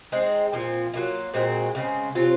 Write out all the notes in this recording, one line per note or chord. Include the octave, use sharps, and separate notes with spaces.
G#3 C4 D#4
A#2 F3 C4
F#3 A#3 F4
A#2 G#3 C4 F#4
C#3 G#3 C4
C3 F#3 C4 F4